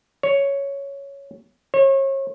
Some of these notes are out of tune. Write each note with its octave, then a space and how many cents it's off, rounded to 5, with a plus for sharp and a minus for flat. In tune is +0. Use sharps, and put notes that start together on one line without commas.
C#5 +5
C#5 -35